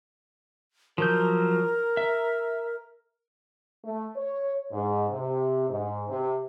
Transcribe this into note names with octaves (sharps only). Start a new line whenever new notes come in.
F3 F#3 A#4 G6
E5
A3
C#5
G#2
C3
G#2
C3